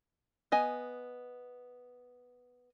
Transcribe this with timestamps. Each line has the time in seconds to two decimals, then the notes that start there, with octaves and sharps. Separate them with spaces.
0.52 B3 D#5 G#5